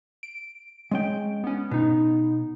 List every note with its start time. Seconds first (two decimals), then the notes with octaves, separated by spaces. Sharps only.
0.23 D7
0.91 G#3 C#4 G5
1.44 B3 C#4
1.71 B2 B3 D#4